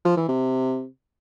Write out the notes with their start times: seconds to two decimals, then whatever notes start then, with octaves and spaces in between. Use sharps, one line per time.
0.05 F3
0.17 E3
0.28 C3